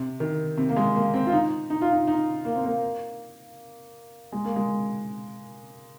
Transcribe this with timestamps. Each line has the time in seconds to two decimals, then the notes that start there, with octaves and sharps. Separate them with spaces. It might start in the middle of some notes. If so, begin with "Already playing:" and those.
Already playing: C3
0.20 D#3
0.57 C3
0.69 A#3
0.77 G#3
0.95 A#3
1.14 C4
1.27 F4
1.32 D#4
1.70 D#4
1.81 F4
1.92 D#4
2.07 D#4
2.45 A#3
2.55 C4
2.65 A#3
4.32 G#3
4.45 A#3
4.56 G#3